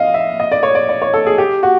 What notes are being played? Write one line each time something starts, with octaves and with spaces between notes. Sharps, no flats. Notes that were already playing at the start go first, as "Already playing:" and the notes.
Already playing: D#5 F5
E5
D#5
D5
C#5
D5
D5
C#5
A4
G#4
G4
F#4